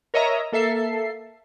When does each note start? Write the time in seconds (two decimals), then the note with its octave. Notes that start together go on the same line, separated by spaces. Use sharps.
0.14 A#4 C#5 D#5 E5 A#5
0.52 A#3 A4 E5 C7